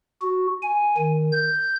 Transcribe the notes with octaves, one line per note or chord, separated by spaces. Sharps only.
F#4
G#5
D#3
G6